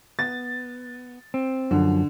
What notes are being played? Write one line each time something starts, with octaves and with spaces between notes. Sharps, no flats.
B3 A6
C4
F#2 D3 F3